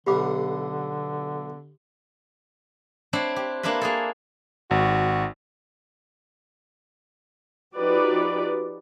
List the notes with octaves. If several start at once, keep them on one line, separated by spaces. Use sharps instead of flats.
B1 B2 D3 G4 B5 D6
C4 D4 E4 C5 C#5
G4
A#3 D4 E4 F4 B4
A#3 G#4 A4
G#1 F#4
F3 D#4 F#4 G4 B4 D5